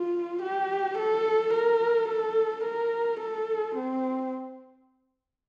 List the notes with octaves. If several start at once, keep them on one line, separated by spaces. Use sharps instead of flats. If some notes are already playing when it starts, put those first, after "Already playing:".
Already playing: F4
G4
A4
A#4
A4
A#4
A4
C4